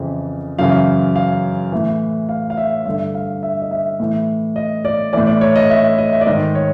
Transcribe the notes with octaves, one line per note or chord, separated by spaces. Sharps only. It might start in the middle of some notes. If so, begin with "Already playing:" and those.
Already playing: F2 C#3 E3
F#2 C#3 E3 F5
F5
A2 E3
F5
F5
E5
G2 D3 E5
F5
E5
D#5
E5
A2 E3
D#5
D5
A2 E3 D5
D5
C#5
D#5
E5
D#5
E5
D5
G#2 D#3 D#5
C#5